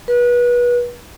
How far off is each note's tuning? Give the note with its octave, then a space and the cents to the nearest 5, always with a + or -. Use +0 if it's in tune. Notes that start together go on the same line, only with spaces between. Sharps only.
B4 -30